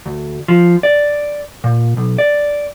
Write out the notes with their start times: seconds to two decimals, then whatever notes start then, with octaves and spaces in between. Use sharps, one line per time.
0.06 D2
0.48 F3
0.83 D5
1.64 A#2
1.97 B1
2.18 D5